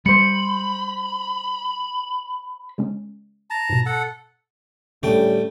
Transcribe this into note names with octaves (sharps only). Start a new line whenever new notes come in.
G3 C5 B5 C#7
C#3 G#3 C#4
A5 A#5
G#2 B2
A4 F#5
A2 D3 G3 A3 C#4 G5